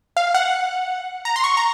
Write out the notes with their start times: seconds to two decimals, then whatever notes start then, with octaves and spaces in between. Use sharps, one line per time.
0.17 F5
0.34 F#5
1.25 A#5
1.36 C6
1.44 C#6
1.57 A#5